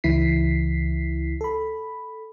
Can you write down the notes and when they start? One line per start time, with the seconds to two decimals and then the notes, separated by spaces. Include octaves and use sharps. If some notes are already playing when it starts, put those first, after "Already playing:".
0.04 C#2 E3 E4 B6 C7
1.41 A4 B5